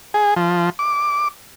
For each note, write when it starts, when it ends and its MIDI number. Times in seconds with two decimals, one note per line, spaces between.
0.14 0.34 68
0.36 0.70 53
0.79 1.28 86